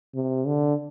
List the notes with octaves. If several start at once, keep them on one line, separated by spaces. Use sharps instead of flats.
C3
D3